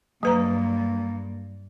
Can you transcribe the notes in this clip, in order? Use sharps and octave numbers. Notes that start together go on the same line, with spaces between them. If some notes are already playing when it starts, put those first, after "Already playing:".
G2 F#3 A#3 B4 A#5